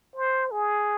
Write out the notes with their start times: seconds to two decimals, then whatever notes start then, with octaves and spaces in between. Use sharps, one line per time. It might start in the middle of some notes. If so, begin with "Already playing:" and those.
0.16 C5
0.51 G#4